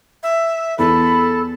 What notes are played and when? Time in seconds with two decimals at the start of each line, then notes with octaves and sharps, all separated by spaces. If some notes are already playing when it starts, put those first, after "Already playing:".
0.23 E5
0.78 E2 A4 B5